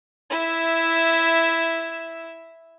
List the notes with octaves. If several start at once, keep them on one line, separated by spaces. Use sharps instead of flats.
E4 E5